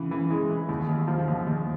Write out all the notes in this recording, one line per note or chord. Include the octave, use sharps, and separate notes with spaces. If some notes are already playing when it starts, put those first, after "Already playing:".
Already playing: C#3 E3
E3
G#3
E3
D#2
D#2
F3
D#2
D#2